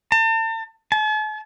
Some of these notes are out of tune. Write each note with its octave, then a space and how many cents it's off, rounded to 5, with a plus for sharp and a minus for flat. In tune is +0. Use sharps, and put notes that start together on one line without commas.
A5 +40
A5 -45